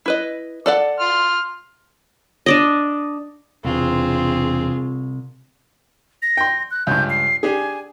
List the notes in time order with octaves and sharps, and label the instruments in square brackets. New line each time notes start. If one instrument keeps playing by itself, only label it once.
[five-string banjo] E4 B4 D#5
A4 D5 F#5
[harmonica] C6 F6
[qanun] D4 D5 D#5
[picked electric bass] E1 [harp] C2 [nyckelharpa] C4 [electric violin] F4 G#4
[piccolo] A#6
[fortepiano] G5 C6
[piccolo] F#6
[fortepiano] C#2 G2 [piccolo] G6
[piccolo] C7
[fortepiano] D4 G4 G#4 [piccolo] G#5